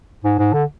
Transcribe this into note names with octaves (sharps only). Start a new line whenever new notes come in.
G#2
G#2
D3